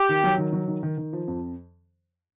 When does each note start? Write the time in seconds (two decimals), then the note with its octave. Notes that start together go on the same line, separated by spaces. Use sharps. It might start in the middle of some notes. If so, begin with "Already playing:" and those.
Already playing: G4
0.09 D#3
0.23 F#3
0.38 D#3
0.53 F#3
0.68 D#3
0.83 D#3
0.97 D#3
1.13 F3
1.28 F2